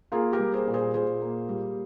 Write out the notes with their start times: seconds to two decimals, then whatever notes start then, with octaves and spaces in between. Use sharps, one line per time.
0.12 A#3 F4 G#4
0.33 G4 A#4
0.39 G3
0.53 G#4 C5
0.67 A#2
0.74 G#4 C5
0.94 A#2 G#4 C5
1.22 A#3
1.49 G3